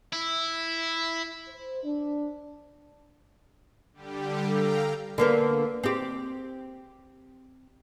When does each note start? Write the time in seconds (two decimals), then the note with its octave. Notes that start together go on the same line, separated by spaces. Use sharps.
0.13 E4
1.48 C5
1.84 D4
3.93 D3 G3 G4
4.46 A4 F5 G5 A#5
5.18 D3 A#3 B3
5.83 C4 G4